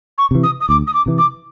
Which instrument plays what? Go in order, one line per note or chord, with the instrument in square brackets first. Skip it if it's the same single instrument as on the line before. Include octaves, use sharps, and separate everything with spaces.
[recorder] C#6
[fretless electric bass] C3 E3
[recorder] D#6
D#6
[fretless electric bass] D2 [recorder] D6
[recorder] D#6
D6
[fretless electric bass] C3 E3
[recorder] D6